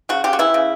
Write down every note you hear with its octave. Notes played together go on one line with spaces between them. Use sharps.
C#3 F#4
C#3 G4
F#4
E3 E4
C#3